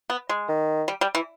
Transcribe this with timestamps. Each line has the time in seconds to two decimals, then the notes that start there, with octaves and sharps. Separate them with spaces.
0.10 B3
0.29 G#3
0.48 D#3
0.88 G3
1.01 G3
1.15 E3